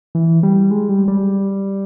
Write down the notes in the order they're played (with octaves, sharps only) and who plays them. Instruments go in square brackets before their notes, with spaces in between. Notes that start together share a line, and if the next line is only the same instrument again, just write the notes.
[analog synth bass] E3
G3
G#3
G3
G3